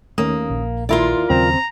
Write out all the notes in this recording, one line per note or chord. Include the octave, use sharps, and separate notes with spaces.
D#2 A3 A#3 C#4 D#6
A#1
D#2 E4 F4 A#4 D5 C6
D#2 C#3 F#3 C4 C5 A#5